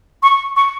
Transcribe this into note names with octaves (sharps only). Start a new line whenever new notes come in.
C#6
C#6